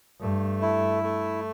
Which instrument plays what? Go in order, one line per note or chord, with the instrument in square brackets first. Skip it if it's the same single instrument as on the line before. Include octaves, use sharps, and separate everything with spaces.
[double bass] G2 [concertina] A3
[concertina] E4
A3